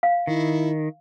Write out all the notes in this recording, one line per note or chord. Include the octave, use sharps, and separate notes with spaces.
F5
D#3 E4